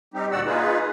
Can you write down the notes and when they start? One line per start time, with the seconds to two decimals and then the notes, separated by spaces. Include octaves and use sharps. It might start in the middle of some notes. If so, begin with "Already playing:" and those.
0.14 G3 C4 D#4 G4
0.32 D2 A#2 F#4 D5 F#5 E6
0.46 A#3 D#4 F4 G#4 B4